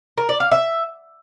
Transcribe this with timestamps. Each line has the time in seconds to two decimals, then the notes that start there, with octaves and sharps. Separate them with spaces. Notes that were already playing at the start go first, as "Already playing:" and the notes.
0.18 A#4
0.29 D5
0.40 F5
0.51 E5